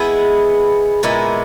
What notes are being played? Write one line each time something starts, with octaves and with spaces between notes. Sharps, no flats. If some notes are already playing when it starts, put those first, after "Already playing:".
Already playing: G#3 B3 E4 G#4
A#2 G#3 B3 E4